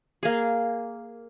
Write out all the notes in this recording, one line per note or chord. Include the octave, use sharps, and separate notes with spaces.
A#3 G#4